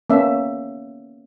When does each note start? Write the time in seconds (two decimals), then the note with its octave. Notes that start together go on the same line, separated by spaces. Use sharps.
0.10 A#3 B3 C#4 E5